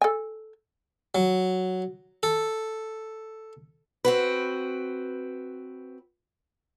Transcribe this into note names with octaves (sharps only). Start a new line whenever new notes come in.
A4 G#5
F#3
A4
C4 F#4 B4